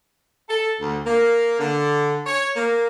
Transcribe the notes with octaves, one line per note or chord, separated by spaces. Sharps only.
A4
D2
A#3
D3
C#5
A#3